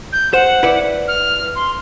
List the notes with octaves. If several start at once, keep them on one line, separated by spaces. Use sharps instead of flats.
G6
C5 F#5
E4 B4 D5
F6
C6